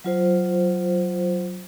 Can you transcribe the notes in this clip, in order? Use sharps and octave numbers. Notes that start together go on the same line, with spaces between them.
F#3 F4 C5